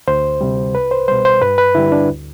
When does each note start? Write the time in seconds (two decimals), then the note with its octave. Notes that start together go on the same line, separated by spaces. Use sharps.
0.08 D2 C5
0.41 C3 G3
0.75 C2 B4
0.91 C5
1.08 B2 G3 C5
1.25 C5
1.41 G2 B4
1.58 B4
1.75 D3 G3 E4
1.92 D4
2.09 D2